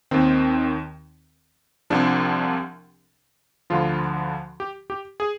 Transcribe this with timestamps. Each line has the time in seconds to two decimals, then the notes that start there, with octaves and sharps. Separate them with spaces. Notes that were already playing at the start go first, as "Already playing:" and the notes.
0.11 D#2 D#3 C4
1.90 C2 C3 F3 D4
3.70 D2 D3 F3 F4
4.60 G4
4.90 G4
5.20 G#4